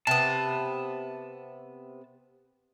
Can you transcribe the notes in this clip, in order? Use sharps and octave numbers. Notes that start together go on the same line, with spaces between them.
C3 B3 A5